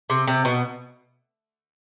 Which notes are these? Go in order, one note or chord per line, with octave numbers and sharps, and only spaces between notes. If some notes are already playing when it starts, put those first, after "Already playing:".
C3
C3
B2